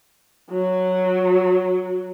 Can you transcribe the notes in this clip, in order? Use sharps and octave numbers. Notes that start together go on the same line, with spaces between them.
F#3 F#4